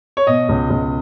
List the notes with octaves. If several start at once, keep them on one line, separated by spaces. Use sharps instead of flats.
C#5
B2 D#5
C#2
C#2